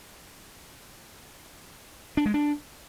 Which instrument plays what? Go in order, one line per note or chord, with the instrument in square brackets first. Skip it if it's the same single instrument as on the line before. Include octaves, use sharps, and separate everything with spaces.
[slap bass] D4
G#3
D4